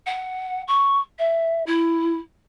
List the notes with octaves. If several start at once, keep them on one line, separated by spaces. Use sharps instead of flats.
F#5
C#6
E5
E4